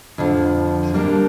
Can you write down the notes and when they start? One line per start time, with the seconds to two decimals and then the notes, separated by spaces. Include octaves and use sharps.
0.18 F2 D3 F3
0.94 G3 A#3 D4 G4 A#4